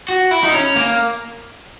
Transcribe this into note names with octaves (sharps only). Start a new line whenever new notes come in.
F#4
E4
D#4
C#4
A#3